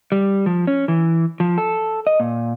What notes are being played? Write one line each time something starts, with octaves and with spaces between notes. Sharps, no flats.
G3
F3
C#4
E3
F3
A4
D#5
A#2